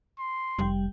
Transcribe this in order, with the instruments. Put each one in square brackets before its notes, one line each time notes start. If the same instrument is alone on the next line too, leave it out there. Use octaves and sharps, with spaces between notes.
[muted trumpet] C6
[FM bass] F1 [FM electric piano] G3 G5